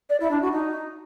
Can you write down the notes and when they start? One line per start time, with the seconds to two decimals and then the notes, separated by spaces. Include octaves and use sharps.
0.10 D5
0.20 E4
0.31 D4
0.42 F#4
0.52 D#4